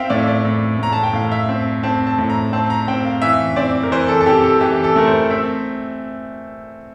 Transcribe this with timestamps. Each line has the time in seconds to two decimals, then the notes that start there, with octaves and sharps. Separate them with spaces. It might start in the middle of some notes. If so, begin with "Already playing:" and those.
Already playing: C4 E5 F5 G5
0.10 A2 D5
0.27 D5
0.45 A2
0.79 A2 A#5
0.93 A5
1.03 G5
1.13 A2 F5
1.32 E5
1.49 C4
1.83 C4 A5
2.07 A5
2.19 A2
2.30 A#5
2.53 C4 A5
2.70 A#5
2.88 C4 G5
3.05 F5
3.22 E3 E5
3.56 C4 D5
3.83 A#4
3.92 E3 C5
4.08 A4
4.21 A4
4.26 C4 G4
4.43 A4
4.61 E3 G4
4.84 A4
4.96 A3 A#4
5.07 C5
5.30 C4 E5